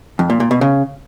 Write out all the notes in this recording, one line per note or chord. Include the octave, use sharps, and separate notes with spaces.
F2
A#2
A#2
B2
C#3